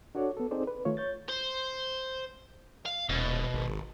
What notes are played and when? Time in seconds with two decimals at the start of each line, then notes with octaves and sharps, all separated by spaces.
0.15 D4 F#4 A4 C#5 D5
0.37 B3 A4
0.51 C4 D#4 G#4 A4 C5 D5
0.67 B4
0.85 D#3 A3 F4 C#5
0.97 C#5 G6 A6
1.29 C5
2.86 F5
3.09 D#1 B2
3.54 G#1